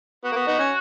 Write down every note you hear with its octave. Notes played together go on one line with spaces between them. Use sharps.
B3 F#4
A#3
B3
B3 D#4
C#4